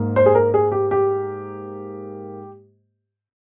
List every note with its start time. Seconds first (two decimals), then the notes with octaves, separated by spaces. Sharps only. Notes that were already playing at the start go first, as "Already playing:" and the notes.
Already playing: G#2 A#3
0.16 C5
0.26 G#4
0.35 A#4
0.54 G#4
0.72 G4
0.91 G4